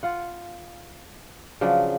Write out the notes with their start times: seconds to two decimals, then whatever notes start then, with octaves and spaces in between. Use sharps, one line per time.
0.03 F4 F#5
1.61 C#3 F3 F#3 D4